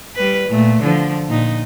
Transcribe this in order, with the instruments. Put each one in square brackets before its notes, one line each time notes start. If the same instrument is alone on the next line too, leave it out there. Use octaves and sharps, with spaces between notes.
[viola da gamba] G3 B4
A#2 A3
D3 F3
A#2 D#4